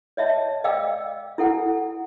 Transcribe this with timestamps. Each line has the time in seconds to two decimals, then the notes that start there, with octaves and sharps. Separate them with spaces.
0.17 C#5 D#5 E5 A5
0.64 D5 D#5 F5 G5 D6 E6
1.38 E4 A4 F#5 G#5